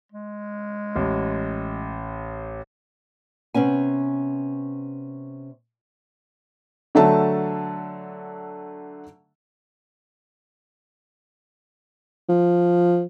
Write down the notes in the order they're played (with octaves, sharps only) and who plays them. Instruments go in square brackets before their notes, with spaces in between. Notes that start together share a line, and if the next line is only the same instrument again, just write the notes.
[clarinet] G#3
[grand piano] A1
[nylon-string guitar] C3 B3 C#4 G#5
[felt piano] D3 F#3 A3 E5 A5
[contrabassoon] F3